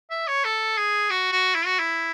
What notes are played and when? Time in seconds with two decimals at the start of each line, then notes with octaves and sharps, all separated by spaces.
0.10 E5
0.27 C#5
0.44 A4
0.77 G#4
1.10 F#4
1.32 F#4
1.55 E4
1.66 F#4
1.79 E4